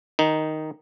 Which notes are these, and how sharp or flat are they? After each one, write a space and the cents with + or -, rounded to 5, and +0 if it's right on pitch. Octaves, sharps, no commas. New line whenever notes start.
D#3 +0 D#4 +0